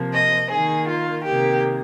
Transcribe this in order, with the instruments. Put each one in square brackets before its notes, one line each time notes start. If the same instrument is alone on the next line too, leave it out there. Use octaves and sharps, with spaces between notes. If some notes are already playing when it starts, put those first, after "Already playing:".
Already playing: [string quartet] C3 F3 A#3
D#5
D#3 A#3 G#4
F4
C3 D#3 A#3 G4